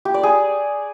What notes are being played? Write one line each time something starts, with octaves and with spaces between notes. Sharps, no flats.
G4
D5
G#4